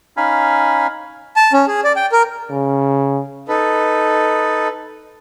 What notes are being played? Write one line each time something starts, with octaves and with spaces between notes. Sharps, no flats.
C#4 D#4 F5 G#5 B5
A5
C#4
G#4
D5
G5
A#4
C#3
D#4 A4 B4